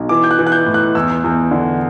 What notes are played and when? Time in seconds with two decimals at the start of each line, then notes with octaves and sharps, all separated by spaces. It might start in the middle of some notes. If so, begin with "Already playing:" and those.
Already playing: B1
0.09 E3 D6
0.24 G6
0.31 F#6
0.39 E3
0.47 F#6
0.52 G6
0.66 A2
0.74 F#6
0.95 E2 E6
1.24 E2
1.51 D3